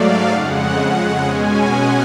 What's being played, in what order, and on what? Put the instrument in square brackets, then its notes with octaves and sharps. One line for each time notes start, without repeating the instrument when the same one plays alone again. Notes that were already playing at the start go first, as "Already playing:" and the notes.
Already playing: [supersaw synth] G#2 F#3 A3 D5 F5
F2 C#3 G#3 F#5
B2 G#3 C#4 G#5
F#5